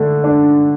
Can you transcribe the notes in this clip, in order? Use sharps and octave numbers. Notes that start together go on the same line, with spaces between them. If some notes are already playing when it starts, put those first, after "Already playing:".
Already playing: D3 A3
D4